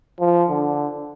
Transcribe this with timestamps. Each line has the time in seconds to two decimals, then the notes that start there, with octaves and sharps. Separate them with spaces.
0.20 F3
0.49 D3